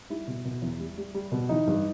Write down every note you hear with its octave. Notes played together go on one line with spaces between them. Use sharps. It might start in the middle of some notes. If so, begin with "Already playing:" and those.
G3 E4
B2
B2
E2
G3
G3
G3
B2
E3 D#4
G2